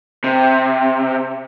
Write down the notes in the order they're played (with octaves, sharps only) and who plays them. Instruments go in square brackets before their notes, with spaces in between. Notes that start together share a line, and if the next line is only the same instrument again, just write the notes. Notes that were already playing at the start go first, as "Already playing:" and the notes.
[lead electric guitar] C3